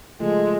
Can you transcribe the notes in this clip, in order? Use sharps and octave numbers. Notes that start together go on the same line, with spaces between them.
C#3 F3 G#3 A3 F4 A4